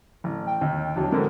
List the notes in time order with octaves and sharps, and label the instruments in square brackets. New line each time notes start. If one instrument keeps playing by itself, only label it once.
[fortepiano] A1
[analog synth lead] G5
[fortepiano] D#2
[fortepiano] E2 F#3 [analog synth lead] D4
[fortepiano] G#2 D3 [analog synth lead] A#4